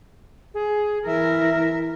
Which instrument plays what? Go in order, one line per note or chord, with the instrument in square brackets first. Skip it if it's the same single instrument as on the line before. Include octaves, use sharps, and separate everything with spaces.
[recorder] G#4
[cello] E3 A#4 [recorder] E5